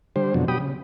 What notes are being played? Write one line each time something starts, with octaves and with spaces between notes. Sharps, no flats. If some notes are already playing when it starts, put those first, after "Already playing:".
D3 G3 C5
F2 B2 D3 F#3
B2 F#3 G4 G5 B5 D#6
C#3